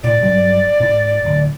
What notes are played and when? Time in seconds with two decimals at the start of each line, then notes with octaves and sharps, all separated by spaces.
0.03 A2 D5
0.21 G2 F#3 G3
0.80 G#2
1.25 D1